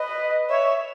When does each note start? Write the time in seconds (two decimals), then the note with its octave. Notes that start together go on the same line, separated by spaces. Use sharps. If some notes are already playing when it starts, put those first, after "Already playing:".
Already playing: B4 D#5
0.49 C#5 E5